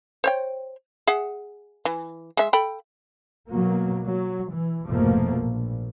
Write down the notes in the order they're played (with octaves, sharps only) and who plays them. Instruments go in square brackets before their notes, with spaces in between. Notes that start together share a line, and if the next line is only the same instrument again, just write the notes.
[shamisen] C5 C#5 G5
G#4 E5 F#5
E3
G#3 E5
A4 G5 B5
[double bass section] B2 F#3 A#3
F#3
E3
F1 G#2 B2 F3 A3 A#3
A#1